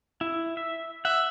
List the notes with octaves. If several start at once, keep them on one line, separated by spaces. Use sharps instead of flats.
E4
E5
E5 F#5